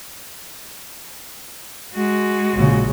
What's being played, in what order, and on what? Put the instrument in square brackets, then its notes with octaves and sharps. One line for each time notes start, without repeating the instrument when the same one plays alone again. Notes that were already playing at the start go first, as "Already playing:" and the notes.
[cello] G#3 F#4
[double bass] A#1 C#3